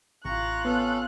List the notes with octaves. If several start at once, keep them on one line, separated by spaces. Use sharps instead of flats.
A1 C3 F4 A#5 C#6 F#6
B3 C#4 A4